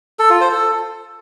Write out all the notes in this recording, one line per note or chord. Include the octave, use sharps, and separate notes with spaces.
A4
F4
C5
A4